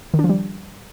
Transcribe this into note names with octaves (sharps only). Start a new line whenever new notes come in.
D#3
D4
F3
G3